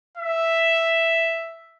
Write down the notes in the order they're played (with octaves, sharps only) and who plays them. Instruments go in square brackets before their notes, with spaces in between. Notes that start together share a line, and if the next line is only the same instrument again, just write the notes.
[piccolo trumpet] E5